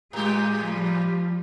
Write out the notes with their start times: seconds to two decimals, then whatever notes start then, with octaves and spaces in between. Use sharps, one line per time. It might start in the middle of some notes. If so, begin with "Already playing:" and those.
0.13 A2 G#3 G4
0.65 F3 G3